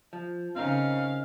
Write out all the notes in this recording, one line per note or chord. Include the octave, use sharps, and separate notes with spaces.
F3
C#3 C4 C#4 D#4 A#4 F5